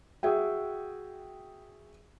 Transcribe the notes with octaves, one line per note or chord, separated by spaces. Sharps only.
F#4 G#4 E5 G5